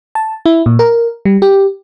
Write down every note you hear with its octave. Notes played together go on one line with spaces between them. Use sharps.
A5
E4
A#2
A#4
G3
G4